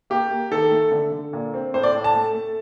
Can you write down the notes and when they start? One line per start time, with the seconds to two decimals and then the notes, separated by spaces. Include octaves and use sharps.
0.10 A#3 G4
0.30 A#3
0.51 D#3 A4
0.71 A3
0.91 D3
1.12 D3
1.33 A#2
1.54 C4
1.74 A2 C5
1.83 D5
1.95 A2
2.04 A5
2.14 A3
2.34 A3